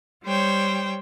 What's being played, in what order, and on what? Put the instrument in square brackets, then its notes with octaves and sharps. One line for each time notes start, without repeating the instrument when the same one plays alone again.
[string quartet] G3 C5 C#5 G5